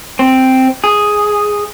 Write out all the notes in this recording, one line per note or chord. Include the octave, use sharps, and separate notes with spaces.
C4
G#4